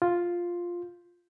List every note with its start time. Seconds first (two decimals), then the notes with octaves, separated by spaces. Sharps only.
0.02 F4